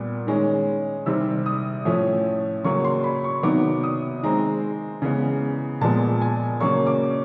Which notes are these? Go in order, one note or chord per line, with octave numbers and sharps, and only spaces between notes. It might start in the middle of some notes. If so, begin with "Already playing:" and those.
Already playing: A#2 G3 B3
D#3 G#3 C#4
C3 D#3 G3 C4 E6
D#6
A2 F3 A3 C#4
C#3 F#3 A#3 C#4 C#6
C6
B5
C#6
C3 D#3 F#3 B3 D6
D#6
D#3 G#3 C4 A#5
C#3 E3 G#3 B3
A#2 F3 G#3 B3 A5
G#5
C#3 F#3 A#3 C#4 C#6
D6